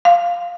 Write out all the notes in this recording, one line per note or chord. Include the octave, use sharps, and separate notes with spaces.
F5